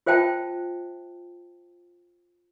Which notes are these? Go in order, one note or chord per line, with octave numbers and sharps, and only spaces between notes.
F4 C5 E5 G5 A5